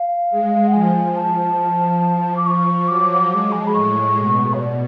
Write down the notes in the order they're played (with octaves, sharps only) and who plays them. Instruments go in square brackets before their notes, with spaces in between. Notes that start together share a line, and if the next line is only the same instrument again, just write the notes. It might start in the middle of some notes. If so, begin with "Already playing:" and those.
Already playing: [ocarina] F5
[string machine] G#3
[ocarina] F#5
[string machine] F3 [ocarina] G#5
[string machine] F3 [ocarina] A5
[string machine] F3
[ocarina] D6
[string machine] F3 [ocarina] C#6
[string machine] F#3 [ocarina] D6
[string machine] G#3 [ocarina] D6
[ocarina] G#5
A5
B5
[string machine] A2 [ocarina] C#6
[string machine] B2
[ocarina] C#5
D5